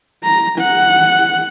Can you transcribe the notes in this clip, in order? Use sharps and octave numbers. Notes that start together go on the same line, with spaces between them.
A#5
F#5